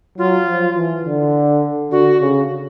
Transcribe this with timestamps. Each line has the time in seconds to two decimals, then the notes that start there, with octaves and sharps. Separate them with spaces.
0.18 F#3 F4
0.47 F3
0.76 E3
1.05 D3
1.91 D3 F#4
2.20 C#3